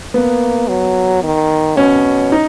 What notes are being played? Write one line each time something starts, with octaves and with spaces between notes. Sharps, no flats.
A#3 B3
F#3
D#3
B2 C#4
D#4